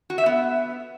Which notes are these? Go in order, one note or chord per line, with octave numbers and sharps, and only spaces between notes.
F#4
E5
B3